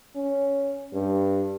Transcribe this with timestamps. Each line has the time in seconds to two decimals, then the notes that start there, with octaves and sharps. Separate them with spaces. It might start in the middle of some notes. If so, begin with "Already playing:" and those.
0.16 C#4
0.93 G2